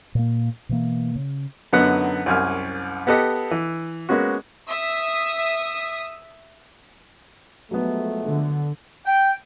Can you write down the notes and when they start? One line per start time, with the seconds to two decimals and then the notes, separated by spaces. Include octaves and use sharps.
0.15 A#2 A#3
0.69 B2 E3 A#3
1.15 C#3
1.73 F#2 D3 F#3 B3 D#4 F#5
2.26 C2 F#2 G#5 F6
3.07 B3 G4 A4 D#5 F#5
3.51 E3
4.09 G#3 A#3 B3 C#4 F#4
4.70 E5 D#6
7.71 F3 F#3 G#3 A3 B3
8.25 D3
9.06 G5